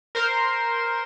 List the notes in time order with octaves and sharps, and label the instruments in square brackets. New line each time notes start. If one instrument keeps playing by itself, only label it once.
[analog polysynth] A#4 C5 C6